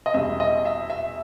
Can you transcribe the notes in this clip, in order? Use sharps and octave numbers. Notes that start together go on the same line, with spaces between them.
D#5
E2 B2 G3 E5
D#5
E5
E5